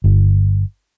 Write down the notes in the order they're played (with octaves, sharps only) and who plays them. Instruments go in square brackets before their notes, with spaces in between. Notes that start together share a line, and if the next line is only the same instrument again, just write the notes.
[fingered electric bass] G1